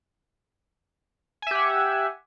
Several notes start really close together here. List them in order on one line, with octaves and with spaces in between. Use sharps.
G#5 E5 G4 F#5